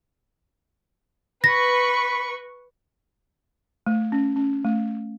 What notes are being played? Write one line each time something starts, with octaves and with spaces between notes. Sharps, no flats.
B4 B5 C#6 A#6
A3
C#4
C#4
A3